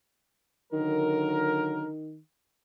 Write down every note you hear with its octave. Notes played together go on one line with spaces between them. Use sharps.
D3 D#3 F#3 A#4